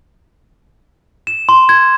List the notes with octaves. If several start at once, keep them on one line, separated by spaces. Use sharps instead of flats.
E7
C6
G#6